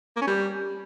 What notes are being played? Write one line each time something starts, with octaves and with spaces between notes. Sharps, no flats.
A#3
C#4
G3